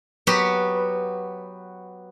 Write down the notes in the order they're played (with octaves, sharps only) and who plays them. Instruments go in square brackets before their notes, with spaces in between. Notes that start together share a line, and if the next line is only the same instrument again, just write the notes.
[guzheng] F#3 B3 F#4 G4 B4